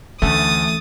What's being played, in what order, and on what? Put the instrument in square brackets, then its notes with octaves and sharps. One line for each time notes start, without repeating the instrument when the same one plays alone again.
[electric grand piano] D2 [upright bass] E3 C#4 [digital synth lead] A3 [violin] D#6 A6